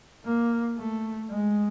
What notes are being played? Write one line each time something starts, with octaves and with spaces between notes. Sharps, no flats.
A#3
A3
G#3